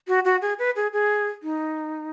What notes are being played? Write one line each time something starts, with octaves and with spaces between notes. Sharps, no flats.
F#4
F#4
G#4
B4
G#4
G#4
D#4